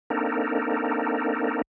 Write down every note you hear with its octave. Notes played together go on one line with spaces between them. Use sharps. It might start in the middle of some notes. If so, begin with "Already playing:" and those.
A#3 C4 D4 D#4 A4 A#4